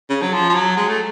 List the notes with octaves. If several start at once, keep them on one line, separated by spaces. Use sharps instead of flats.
C#3
F#3
F3
F3
F#3
G#3
A3